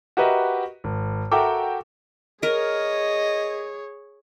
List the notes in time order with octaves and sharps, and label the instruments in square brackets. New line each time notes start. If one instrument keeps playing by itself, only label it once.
[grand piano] F#4 G4 A#4 B4 D#5 E5
G#1
F#4 A4 A#4 E5 G5 D6
[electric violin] G#4 C#5 [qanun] A#4 [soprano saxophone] D#5